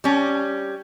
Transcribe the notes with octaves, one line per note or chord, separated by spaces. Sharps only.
G3 C#4